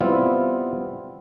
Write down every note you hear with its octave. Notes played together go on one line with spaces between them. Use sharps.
G3 B3 C4 E4 F4